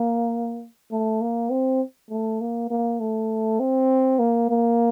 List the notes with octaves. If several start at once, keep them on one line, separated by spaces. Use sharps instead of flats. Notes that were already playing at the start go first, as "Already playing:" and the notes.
Already playing: A#3
A3
A#3
C4
A3
A#3
A#3
A3
C4
A#3
A#3